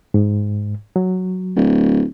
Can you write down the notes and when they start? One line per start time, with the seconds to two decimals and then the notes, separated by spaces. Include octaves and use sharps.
0.14 G#2
0.96 F#3
1.56 D1